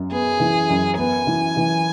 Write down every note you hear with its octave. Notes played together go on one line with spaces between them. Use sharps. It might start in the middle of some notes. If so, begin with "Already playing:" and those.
Already playing: F#2
B3 G#4
E3
F#2
B3 G#5
E3
E3